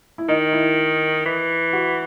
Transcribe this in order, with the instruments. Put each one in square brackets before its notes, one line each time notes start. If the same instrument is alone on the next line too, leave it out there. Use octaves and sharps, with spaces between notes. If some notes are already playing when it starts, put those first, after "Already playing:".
[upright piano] E4
[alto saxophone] D#3 [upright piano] D#4
[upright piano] E4
[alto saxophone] E3
[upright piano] F#4